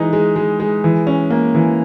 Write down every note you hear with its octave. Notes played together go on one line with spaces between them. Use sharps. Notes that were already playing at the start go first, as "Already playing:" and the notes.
Already playing: E3 G#3 D#4
G#3
G#3
G#3
E3
C#4
A#3
E3